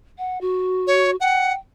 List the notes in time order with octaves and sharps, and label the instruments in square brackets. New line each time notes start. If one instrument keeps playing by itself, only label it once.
[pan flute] F#5
F#4
[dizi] C#5
[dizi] F#5 [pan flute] G5